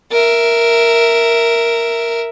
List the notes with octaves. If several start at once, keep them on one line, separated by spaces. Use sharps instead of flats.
A#4 E5